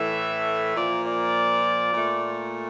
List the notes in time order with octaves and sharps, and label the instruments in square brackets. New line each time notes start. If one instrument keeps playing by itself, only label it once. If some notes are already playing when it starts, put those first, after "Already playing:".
Already playing: [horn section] A2 E3 A3 E5
A#2 F3 A#3 D5
D5
A#2 A3